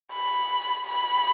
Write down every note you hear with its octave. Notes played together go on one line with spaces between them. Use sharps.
B5
B5